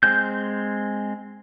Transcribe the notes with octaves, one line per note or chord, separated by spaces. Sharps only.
G#3 C4 G6